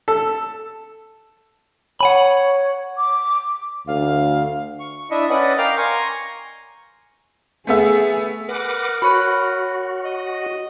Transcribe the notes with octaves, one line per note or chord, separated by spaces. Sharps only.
A4
C#5 F#5 G#5 B5
D6
D2 F5
C#6
D4 E4 D#5 E5
C#4 B4 D5 D#5 F#5
A#4 F5 G5 D6 F6
G#5 A#5 C6 C#6
A3 B3 G#4 E5
A#4 B4 F#5 D6
F#4 B4 C#5 B5
D#5